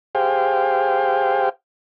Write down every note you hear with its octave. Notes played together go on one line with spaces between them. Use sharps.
G4 G#4 C5 F5 G5